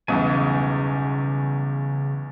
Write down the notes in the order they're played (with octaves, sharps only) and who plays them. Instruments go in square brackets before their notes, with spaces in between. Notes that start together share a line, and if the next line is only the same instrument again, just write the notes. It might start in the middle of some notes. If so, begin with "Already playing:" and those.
[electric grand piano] B1 E2 [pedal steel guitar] C#3 G#5 [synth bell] G3 B3 C#4